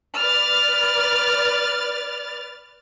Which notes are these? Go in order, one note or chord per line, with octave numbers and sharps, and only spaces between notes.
B4 D5 F6 A6